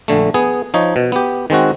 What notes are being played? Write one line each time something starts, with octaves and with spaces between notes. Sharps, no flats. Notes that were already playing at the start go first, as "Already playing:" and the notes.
A#1 D3 A3
B3 G#4
F3 D#4 C#5
B2
B3 G4
D#3 G#3 C4 F#4